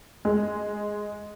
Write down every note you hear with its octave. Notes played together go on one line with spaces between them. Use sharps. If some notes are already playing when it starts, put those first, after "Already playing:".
G#3